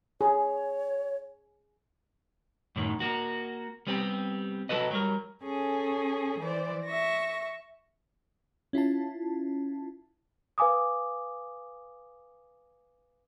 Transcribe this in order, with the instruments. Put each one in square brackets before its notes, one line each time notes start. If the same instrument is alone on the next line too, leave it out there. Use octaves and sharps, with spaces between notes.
[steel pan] G#4 [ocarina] C#5
[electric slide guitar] F#2 A2 D#3
A#3 F#4
G3 B3 C4 G4
F#3 F#4 A4 B4 D#5
F#3 G3 A#4
[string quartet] C#4 G#4 A4
E3 C5 D5
E5 C#6 A#6
[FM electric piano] C#4 E4 F4 A5
[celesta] B4 F5 G#5 D6 D#6